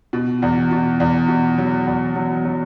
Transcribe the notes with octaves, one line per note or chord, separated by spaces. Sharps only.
B2
E2
B2
E2
B2
F#3
E2
F#3
F#3